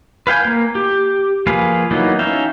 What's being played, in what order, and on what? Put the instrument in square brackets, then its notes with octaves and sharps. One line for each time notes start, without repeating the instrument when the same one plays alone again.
[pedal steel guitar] B4 F5 G5 G#5
A#3
G4
F3 A#3 G#4 B4 F5
E3 F#3 A#3 B3 D#4
C#4 D#4 E5 F5 G5